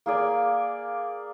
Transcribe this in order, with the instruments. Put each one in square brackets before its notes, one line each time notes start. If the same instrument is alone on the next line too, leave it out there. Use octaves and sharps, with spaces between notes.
[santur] A#3 G#4 D5